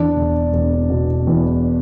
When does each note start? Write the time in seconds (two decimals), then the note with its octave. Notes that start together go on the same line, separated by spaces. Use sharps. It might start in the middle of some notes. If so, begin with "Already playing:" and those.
Already playing: E2 D4 D5
0.16 E1
0.53 E1
0.90 B2
1.27 E2